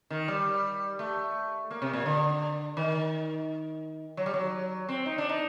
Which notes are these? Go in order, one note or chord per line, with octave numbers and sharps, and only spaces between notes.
D#3
G3
A3
A#3
C3
A#2
D3
D#3
F#3
G3
F#3
C4
D#4
D4
D#4